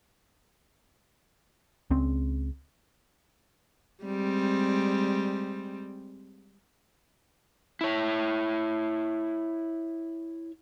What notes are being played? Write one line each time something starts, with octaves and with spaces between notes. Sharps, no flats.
C#2 C#3 C4
G3 G#3 C4
E4 C#5